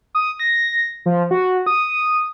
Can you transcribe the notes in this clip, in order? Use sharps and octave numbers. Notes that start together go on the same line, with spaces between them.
D#6
A#6
F3
F#4
D#6